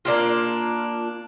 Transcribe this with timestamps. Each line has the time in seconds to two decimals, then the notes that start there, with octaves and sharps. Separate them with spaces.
0.05 A#3 D4 E4 F4